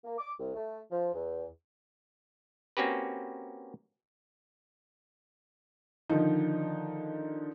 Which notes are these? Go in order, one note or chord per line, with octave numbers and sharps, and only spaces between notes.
A#3
D6
C2
A3
F3
E2
A#3 C4 C#4 F#4 G4 B4
D3 D#3 F3 D#4